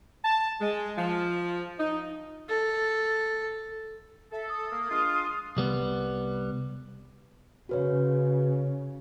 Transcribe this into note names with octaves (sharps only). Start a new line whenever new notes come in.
A5
G#3
F3
D#4
A4
A4 E5
D#6
A#3
G#3 D4 F4
C2 G3 B3
C#3 F#4 B4 C#5